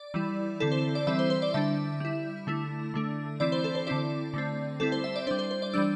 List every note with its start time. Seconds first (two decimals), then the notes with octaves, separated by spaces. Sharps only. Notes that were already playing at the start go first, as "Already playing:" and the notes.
Already playing: D5
0.14 E3 G3 E4
0.60 D3 C4 E4 A4
0.72 C5
0.95 D5
1.07 E3 G3 C4 E4 E5
1.19 C5
1.30 C5
1.42 D5
1.54 D3 G3 D4 E5
2.00 G3 E4
2.47 D3 A3 E4
2.94 D3 A3 D4
3.40 E3 C4 E4 D5
3.52 C5
3.64 A4
3.75 C5
3.87 D3 C4 E4 D5
4.34 D3 A3 C4
4.80 G3 C4 E4 A4
4.92 C5
5.04 E5
5.16 D5
5.27 D4 C5
5.31 G3
5.39 C5
5.51 C5
5.62 D5
5.74 E3 G3 D4 E6